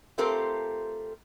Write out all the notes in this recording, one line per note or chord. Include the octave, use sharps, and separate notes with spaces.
A3 C4 F4 G4 A4 A#4